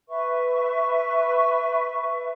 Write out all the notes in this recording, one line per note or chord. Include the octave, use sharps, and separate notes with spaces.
B4 E5 C#6